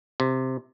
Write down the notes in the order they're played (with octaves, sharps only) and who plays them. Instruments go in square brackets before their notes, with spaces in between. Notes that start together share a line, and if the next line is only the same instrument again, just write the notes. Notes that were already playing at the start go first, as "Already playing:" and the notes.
[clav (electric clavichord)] C3